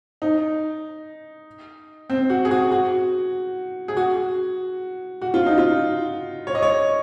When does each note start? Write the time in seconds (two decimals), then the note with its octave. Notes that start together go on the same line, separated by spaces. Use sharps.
0.22 D#4
2.10 C4
2.30 F#4
2.45 G#4
2.51 F#4
2.72 F#4
3.88 G#4
3.97 F#4
5.22 F#4
5.34 F4
5.46 D#4
5.58 F4
6.47 C#5
6.55 D#5
6.62 C#5